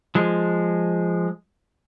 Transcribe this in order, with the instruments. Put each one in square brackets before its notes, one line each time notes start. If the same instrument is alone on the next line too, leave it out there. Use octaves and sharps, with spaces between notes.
[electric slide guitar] F3 G#3